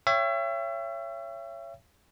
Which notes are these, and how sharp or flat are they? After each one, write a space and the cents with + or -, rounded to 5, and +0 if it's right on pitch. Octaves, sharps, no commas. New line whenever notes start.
C#5 +0 E5 +35 G5 +0